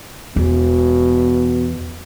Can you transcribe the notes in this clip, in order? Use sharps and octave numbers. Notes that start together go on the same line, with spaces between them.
E2 B2